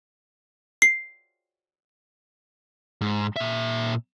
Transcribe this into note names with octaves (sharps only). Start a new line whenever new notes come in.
C7
G#2
A#2 E5